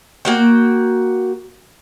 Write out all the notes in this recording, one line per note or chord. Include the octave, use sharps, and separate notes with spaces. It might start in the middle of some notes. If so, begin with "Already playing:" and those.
A#3 F#4 G5